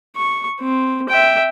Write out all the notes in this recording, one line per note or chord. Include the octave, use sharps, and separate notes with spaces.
C#6
C4
E5 G5